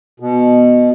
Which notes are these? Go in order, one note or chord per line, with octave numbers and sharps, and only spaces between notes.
B2